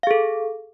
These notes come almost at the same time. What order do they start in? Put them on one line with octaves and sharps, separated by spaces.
F5 G#4 A4